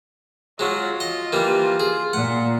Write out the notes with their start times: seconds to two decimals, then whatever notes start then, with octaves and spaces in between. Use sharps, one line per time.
0.59 F#3 G#3 F4
1.00 D#5
1.33 E3 G3 A#3
1.80 G#4
2.13 A#2 F#5